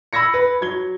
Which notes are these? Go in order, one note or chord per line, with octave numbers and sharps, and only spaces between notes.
B5 E6 G#6 A#6 C#7
B4
F#3 G#6 G7